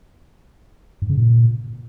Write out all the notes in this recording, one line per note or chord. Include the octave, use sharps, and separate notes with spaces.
G2
C#3
A#2